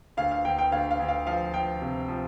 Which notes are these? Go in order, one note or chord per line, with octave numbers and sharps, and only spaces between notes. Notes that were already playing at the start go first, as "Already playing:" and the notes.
D2 F5
F5
D2 G5
G5
D2 F5
F5
D2
F5
F3 F5
F3 G5
C3
F3